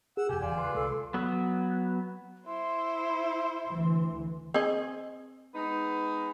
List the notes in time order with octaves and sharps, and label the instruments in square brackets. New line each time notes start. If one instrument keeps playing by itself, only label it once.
[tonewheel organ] G#4 [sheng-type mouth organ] F#5 E6
[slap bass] F2 C3 [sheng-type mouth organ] G4 [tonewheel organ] G#5
[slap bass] D1 E2 E3 [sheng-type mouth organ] F4 D5
[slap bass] C#3 [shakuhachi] B4 [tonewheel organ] C6
[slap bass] C2 C3 G#3 [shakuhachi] A4
[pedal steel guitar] F#3 B3
[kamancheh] E4 C5 [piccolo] C6
[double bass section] D2 E3
[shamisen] C4 G#4 D#5
[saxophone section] G#3 B3 D#4